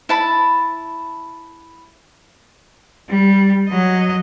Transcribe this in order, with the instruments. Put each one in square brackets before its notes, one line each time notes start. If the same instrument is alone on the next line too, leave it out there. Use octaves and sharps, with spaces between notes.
[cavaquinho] E4 A5 B5
[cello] G3
F#3 D#5